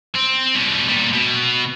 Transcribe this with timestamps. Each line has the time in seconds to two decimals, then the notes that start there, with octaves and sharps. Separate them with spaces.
0.15 C4
0.54 B2 G3
0.89 A#2 G3
1.13 B2